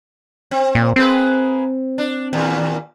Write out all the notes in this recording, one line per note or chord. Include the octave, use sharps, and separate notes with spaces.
C4
A#2
A#3 C4 G#4 B4
D4
D#2 A#2